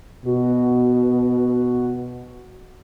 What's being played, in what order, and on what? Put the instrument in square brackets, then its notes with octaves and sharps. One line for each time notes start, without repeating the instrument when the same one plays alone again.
[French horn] B2 [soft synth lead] F#4